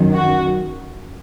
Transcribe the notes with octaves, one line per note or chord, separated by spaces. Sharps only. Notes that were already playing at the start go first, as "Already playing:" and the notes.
Already playing: F#2 D#3
F#4